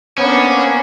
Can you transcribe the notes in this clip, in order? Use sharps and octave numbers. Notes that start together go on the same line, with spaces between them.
A#3 B3 C#4 D4 C5 C#5